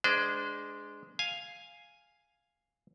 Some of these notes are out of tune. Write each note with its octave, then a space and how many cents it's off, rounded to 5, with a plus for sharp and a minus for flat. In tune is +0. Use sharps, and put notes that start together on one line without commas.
G#3 +0 D4 +0 C5 -40
F5 +0 G#5 +0